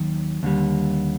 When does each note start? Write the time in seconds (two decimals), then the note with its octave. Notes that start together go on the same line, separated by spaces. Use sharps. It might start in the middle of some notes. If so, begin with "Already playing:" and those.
Already playing: D#2 D#3 F#3
0.43 D#2 D3 G3